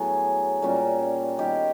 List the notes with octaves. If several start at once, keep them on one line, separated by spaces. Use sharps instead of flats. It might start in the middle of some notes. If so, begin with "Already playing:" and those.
Already playing: A2 F#3 B3 G#4
A#2 G3 A#3 C#4
D#3 G3 B3 G4